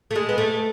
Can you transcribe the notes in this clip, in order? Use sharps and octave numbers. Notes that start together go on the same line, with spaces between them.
A3
G#3
B3
A3